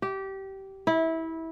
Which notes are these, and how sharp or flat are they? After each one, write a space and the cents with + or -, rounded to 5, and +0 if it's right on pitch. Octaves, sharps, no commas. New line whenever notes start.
G4 -20
E4 -20